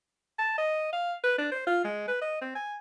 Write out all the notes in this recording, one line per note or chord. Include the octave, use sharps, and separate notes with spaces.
A5
D#5
F5
B4
D4
C5
F4
G#3
B4
D#5
C4
G#5